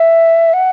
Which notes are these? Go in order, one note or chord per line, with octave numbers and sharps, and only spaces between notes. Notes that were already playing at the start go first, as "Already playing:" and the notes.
Already playing: E5
F#5